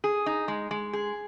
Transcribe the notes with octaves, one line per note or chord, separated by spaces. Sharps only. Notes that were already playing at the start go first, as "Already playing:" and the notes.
G#4
D#4
G#3
G#3
G#4